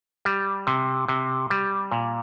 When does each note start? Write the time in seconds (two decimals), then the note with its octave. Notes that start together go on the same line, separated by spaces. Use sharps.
0.25 G3
0.67 C3
1.08 C3
1.50 G3
1.92 A#2